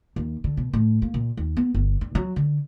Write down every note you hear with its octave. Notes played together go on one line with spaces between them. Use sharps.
D#2
D3
B2
A2
A#3
A#2
D#2
B3
G1
G2
F#3
D3